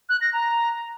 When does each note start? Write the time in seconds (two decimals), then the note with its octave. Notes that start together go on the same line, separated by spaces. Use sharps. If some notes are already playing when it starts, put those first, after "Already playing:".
0.09 F#6
0.21 A#6
0.33 A#5